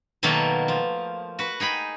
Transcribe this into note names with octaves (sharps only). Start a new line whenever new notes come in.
B2 D#3 F#3 A3 A#3
F3
F#4 B4
D#4 G#4 G5 B5